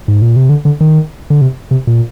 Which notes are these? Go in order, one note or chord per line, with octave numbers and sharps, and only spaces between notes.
G#2
A#2
C3
D3
D3
D#3
D3
C3
C3
A#2